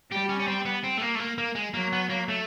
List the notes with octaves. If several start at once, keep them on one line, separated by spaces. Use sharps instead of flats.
G3 G4
C#4
C#4
C4
B3
C4
A3
A#3
A3
A#3
A#3
G#3
F#3 A#3
B3
A#3
A3